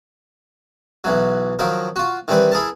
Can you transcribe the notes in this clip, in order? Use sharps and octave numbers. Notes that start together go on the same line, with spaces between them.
B1 E3 F#3
D#3 F3 F#3 A#4
F4 F#4
D#3 E3 G3 C4 B4
E4 G#4 A#4 A5